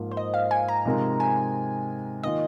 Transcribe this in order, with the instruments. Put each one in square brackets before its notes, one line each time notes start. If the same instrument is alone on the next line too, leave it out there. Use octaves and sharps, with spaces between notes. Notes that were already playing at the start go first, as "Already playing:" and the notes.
Already playing: [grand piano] G#2 F3 A#3 F4
[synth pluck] C5
D#5
F5
G#5
A#5
[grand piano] C3 F3 G#3 D#4 A#4
[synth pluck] G#5
[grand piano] D#3 A#3 F4 [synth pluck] D#5